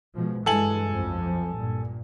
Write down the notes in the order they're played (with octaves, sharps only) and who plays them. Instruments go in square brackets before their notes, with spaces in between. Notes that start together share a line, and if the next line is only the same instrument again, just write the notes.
[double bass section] B2 F3 G#3
[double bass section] G2 E3 G#3 [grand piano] A4 G#5 F#7
[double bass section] B1 F2 F3
G2 A#2